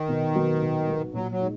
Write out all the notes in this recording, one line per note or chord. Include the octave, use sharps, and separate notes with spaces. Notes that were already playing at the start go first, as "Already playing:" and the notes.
Already playing: D#3
B2
F#3 B3 D#4 F#4
B2
F#3 B3 D#4 F#4
A#2 F#3
F#3
G#3 D#4